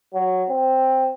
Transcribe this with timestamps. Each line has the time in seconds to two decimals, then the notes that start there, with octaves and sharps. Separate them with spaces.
0.14 F#3
0.49 C4